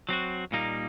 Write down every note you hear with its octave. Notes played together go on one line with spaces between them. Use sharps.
F#3 C4 F#4
A#2 G3 A#3 D#4